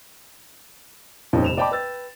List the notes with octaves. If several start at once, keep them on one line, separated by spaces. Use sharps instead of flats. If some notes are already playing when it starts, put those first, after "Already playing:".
D#1 F2 A#2 C#4 D#4
F1 E7 F7
D5 D#5 G5 A5 B5 D6
B4 G5 E6 A6